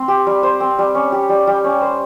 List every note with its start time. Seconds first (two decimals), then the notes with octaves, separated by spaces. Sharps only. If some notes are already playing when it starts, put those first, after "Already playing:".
Already playing: C4 C5
0.08 G4
0.27 G3
0.43 C5
0.60 C4
0.78 G3
0.95 C#4
1.12 G4
1.29 G3
1.47 G3
1.64 C#4
1.81 C5